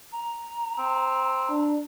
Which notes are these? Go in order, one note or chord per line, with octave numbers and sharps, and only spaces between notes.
A#5
C4
D4